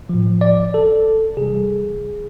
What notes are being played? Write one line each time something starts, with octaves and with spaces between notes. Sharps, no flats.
A2 F3
D5
A4
C3 E3 G3 G#4